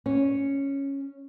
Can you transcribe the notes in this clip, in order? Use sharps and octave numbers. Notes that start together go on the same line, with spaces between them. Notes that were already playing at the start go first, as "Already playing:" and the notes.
C#4